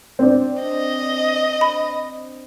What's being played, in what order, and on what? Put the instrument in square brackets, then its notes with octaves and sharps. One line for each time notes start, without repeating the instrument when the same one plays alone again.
[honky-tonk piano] C4 D4
[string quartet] D#5
[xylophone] B5